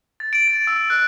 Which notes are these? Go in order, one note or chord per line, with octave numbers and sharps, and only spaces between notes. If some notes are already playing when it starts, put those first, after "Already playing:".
A6
D7
A6
E6
F#6